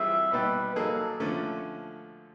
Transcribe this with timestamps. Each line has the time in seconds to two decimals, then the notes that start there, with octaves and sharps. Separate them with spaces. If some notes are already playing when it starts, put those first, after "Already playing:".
Already playing: E3 G3 C4 F4 G#4 E5
0.32 B2 G3 B3 D#4 G4 B4
0.76 F#3 A#3 D#4 G#4 A4
1.20 D3 F3 A3 C#4